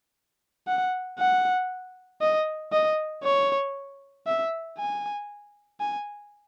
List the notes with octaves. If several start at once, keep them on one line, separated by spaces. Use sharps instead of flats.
F#5
F#5
D#5
D#5
C#5
E5
G#5
G#5